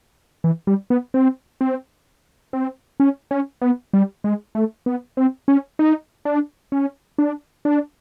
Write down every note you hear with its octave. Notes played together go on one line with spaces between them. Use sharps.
E3
G3
B3
C4
C4
C4
C#4
C#4
B3
G3
G#3
A3
B3
C4
C#4
D#4
D4
C#4
D4
D4